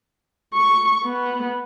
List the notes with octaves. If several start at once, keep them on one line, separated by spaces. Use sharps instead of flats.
C#6
B3